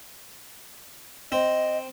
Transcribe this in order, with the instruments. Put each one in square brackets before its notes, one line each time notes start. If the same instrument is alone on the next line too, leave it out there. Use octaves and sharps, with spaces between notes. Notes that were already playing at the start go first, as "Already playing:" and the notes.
[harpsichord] C4 [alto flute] D#5